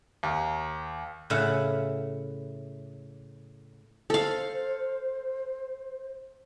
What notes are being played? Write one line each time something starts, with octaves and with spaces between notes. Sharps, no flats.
D#2
A2 C#3 E4 F5 F#5
A4 C5 F5